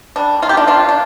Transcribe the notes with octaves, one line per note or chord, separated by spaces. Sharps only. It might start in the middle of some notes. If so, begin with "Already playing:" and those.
G3 D4
A#3 F4
G4
D4 F4
C3 D4 F4
D4